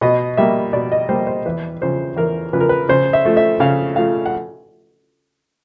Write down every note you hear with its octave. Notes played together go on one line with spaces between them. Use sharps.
B2 D#5
G3 A#3 E5
B2 D5
D#5
G3 A#3 C5
C5
E2 B4
C#3 F3 C5
E2 A#4
C#3 F3 B4
A#4
B4
C#3 C5
E5
F3 A3
E5
C#3 F5
F3 A3 F5
F#5